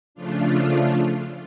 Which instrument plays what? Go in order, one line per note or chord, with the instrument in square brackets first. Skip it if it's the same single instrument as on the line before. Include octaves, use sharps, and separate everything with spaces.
[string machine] C#3 F3 A3 D4 F4